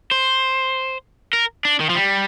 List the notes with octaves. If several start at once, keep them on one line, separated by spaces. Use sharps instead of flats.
C5
A#4
D4
D#3
F3
G3